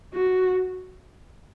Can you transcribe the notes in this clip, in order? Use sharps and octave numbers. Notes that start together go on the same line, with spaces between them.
F#4